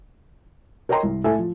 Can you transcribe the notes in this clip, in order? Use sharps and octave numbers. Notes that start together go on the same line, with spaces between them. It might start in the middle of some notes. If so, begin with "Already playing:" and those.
A#4 C#5 D#5 G5 A#5 C6
C2
A2 A4 E5 G#5
F3